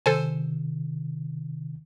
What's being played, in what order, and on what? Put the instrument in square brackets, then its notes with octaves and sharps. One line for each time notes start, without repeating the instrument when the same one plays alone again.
[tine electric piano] C3 D#3 [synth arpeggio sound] A4 C5 G#5